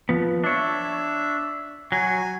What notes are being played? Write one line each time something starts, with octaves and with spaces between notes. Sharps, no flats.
F3 B3
D4 C#5 E5
F#3 G#5